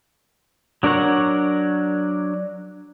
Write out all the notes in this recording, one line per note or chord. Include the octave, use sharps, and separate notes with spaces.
F#3 D4 A#4 C#5 F#5